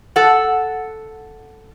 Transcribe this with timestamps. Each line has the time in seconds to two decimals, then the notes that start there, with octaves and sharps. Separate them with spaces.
0.16 A4 F#5